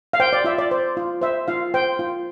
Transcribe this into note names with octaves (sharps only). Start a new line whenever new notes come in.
F5
C5 G5
D5
F4 E5
D5
C5
F4
C5 E5
F4 F5
C5 G5
F4